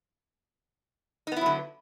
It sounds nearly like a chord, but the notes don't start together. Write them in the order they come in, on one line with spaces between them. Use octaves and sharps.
D#4 B3 E4 F#3 D3